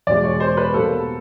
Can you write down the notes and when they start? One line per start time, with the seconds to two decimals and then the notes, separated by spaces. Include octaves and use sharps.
0.07 E2 B2 G#3 D5
0.24 C#5
0.40 C5
0.57 B4
0.73 B2 G3 A#3 A4